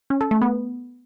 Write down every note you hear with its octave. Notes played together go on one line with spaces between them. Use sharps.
C#4
A4
A3
B3